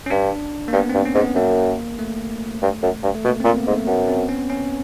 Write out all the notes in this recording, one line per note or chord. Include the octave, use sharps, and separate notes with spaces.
C#4
G2 D4
A#3
G2 B3
C4
G2
C#4
G#2
B3
F#2 A#3
A3
G2
F#2
G2
A3
B2 A#3
A#2 C4
A#3
B3
G#2
A3
F#2 B3
C4
C#4
C#4